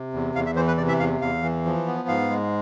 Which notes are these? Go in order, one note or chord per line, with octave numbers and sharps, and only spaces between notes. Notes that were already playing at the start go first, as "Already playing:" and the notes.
Already playing: C3
E2
E2 F5
E5
E3 C5
B4
C3 D5
E5
E2 F5
E2 F5
E3
F3
B3
G#2 F5
G#3